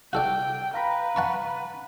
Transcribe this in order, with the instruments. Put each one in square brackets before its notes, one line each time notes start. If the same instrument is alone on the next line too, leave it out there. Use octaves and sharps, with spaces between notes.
[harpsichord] F#4 A4 D5 [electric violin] G5
[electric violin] B4 [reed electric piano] F5 A#5 B5
[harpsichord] F#5 A5 C#6